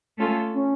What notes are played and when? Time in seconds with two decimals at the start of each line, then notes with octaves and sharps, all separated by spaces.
0.18 A3 C#4 F4 A4
0.54 C#4